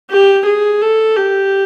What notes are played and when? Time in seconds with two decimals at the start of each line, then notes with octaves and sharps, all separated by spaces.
0.11 G4
0.46 G#4
0.82 A4
1.17 G4